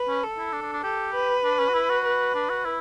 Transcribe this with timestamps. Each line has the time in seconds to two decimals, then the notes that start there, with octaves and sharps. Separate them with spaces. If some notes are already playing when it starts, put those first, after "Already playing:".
Already playing: B4
0.08 C#4
0.23 A4
0.38 E4
0.53 D4
0.63 D4
0.73 D4
0.84 G4 A4
1.14 B4
1.44 D4
1.59 C#4
1.69 F#4
1.74 E4
1.90 F#4
2.04 B4
2.35 D4
2.49 F#4
2.65 E4